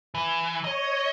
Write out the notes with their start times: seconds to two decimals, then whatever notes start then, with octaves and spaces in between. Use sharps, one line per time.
0.15 E3
0.65 C#5 D#5